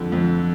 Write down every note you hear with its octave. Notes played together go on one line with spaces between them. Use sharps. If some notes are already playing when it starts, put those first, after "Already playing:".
Already playing: F2 D3
F2